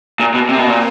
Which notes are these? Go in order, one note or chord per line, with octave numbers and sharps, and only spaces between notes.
A#2 A#3
B2
C3 C4
B2
A#2